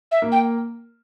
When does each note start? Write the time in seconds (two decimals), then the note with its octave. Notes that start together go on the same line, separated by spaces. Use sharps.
0.12 E5
0.22 A#3
0.32 G5